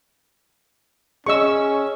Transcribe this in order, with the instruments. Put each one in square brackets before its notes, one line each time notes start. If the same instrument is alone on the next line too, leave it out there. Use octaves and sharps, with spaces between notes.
[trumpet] C#4 [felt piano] G#4 D#5 [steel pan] C#6 E6